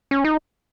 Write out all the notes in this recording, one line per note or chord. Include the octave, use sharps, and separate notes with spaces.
C#4
D#4